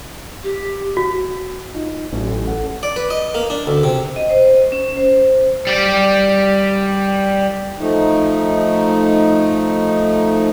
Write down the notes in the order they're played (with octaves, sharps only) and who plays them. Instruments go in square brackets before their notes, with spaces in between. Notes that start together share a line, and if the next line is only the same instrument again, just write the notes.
[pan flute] G4
[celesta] F#4
[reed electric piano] D#4 F4
[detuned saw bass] A1 [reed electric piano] F#3 C#4
[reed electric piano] A4 F#5
[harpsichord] D5
B4
D#5
A#3
D4
D2
C3
[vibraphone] D#5
C5
C#4
C5
[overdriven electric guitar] G3 G4
[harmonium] F3 A3 D#4